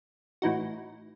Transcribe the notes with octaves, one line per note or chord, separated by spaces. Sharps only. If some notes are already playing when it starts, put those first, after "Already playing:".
A2 E3 D#4 F#4